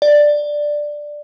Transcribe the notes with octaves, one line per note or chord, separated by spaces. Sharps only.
D5